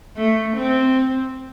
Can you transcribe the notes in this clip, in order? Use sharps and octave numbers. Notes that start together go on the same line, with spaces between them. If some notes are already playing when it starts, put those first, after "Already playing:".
A3
C4